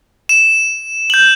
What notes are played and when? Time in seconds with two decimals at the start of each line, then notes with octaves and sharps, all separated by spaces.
0.29 E7
1.10 G6 F#7